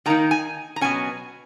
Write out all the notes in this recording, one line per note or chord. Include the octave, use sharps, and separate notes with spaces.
D#3 A#3 D#4 A#5
G#5
A#5
B2 F#3 C#4 G#5